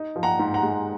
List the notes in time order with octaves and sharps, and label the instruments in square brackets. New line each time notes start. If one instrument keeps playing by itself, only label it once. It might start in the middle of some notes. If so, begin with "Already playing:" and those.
Already playing: [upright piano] D#4
F3
F#5 A#5
G#2
F#5 A#5
G#3